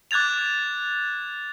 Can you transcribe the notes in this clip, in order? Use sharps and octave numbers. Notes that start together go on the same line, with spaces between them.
D6 F#6 G#6 A6 F7